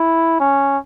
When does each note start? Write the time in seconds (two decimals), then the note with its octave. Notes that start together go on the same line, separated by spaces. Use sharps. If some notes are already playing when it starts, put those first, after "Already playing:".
Already playing: E4
0.40 C#4